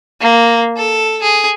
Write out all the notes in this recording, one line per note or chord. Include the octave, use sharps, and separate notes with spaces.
A#3
A4
G#4